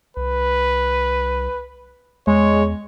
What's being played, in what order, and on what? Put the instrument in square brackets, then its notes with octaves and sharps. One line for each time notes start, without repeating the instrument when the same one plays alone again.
[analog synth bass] C2 [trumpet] B4
[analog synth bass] E2 [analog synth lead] G#3 [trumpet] C#5